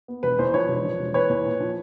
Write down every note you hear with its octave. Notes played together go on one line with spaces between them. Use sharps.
B3
E1 B4
E2 C5
F3 B4 C#5
E1
F3
E1
E2 B4 C#5
E2
A#2
F3